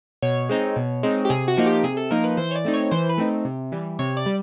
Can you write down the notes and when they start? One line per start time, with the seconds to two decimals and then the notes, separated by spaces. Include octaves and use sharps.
0.22 B2 C#5
0.49 G#3 C4 D#4
0.76 B2
1.03 G#3 C4 D#4
1.25 G4
1.30 C3 G#4
1.48 F#4
1.57 F3 A#3 D#4
1.66 G4
1.84 C3 G#4
1.97 A4
2.11 F3 A#3 D#4 A#4
2.24 B4
2.37 E3 C5
2.51 C#5
2.56 D5
2.65 A3 C4 D#4
2.74 C#5
2.91 E3 C5
3.09 B4
3.18 A3 C4 D#4
3.45 C3
3.72 E3 G3
3.99 C3 C#5
4.17 D5
4.26 G3